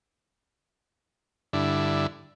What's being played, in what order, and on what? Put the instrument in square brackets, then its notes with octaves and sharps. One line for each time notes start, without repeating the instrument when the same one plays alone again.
[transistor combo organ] G2 D3 E4